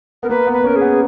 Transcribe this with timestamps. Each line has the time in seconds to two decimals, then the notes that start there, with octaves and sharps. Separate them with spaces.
0.23 B3 A#4
0.29 A#3 B4
0.47 B3
0.53 B4
0.59 B3
0.64 C#4 A#4
0.76 G#4
0.81 B3